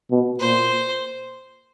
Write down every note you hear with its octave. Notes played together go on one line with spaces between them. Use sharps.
B2
A#2 C5